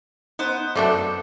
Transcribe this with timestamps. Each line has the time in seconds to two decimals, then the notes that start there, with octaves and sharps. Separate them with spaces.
0.39 B3 D#4 C5
0.76 F#2 F#3 A3 D4 A4 D5 D6